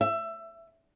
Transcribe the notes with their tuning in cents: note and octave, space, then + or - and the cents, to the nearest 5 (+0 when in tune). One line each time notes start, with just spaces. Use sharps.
E5 +20